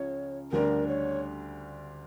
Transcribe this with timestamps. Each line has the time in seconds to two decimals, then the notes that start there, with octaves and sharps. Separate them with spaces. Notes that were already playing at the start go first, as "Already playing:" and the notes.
Already playing: C#2 C#3 F3 C#5
0.52 D2 D3 G3 D4 A#4
0.88 C#5